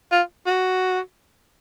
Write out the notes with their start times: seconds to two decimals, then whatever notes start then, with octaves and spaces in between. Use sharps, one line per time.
0.11 F4
0.46 F#4